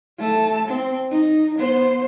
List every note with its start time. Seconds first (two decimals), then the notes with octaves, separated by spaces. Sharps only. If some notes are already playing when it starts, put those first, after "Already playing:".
0.18 A3 A5
0.68 C4
1.10 D#4
1.58 B3 C5